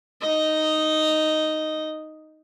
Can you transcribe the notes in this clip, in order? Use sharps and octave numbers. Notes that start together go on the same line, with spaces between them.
D#4 D#5